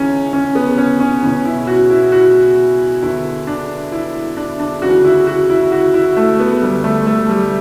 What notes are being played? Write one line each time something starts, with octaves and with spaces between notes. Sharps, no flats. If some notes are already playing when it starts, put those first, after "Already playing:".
Already playing: C#2 C#3 E3 C#4
C#4
B3
C#4
C#4
E2 B2 C#4
E4
F#4
E4
F#4
E2 D3 E4
D4
E4
D4
D4
D2 C#3 E3 F#4
E4
F#4
E4
F#4
E4
A3
B3
D2 D3 G3
A3
A3
G3